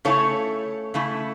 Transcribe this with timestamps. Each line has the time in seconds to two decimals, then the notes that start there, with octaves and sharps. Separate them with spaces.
0.05 C#3 A3 E4 A4 C#5
0.94 C#3 A3 E4